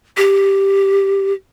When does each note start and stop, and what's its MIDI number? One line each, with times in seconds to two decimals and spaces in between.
0.17 1.33 67